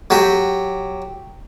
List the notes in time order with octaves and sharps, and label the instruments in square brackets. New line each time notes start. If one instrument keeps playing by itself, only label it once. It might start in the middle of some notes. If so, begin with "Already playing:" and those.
[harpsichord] F#3 G4